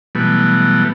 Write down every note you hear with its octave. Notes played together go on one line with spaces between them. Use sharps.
B2 E3 F#3 G3 A3 B3